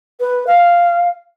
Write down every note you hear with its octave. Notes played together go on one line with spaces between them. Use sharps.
B4
F5